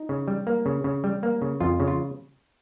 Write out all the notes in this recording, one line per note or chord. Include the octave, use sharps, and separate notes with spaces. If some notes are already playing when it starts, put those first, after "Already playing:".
Already playing: D#4
C#3
G3
A#3
C#3
C#3
G3
A#3
C#3
F2 F4
C#3
F4